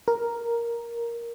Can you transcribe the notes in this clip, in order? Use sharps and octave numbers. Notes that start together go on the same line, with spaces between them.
A#4